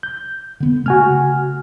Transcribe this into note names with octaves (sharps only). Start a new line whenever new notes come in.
G6
D3 B3
C#3 A3 F#4 G#5 F6